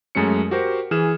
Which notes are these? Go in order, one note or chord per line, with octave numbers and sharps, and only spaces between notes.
F#2 G#3 A3 C#4 C#7
F#4 G4 A#4 C5
E3 G#4 F6 E7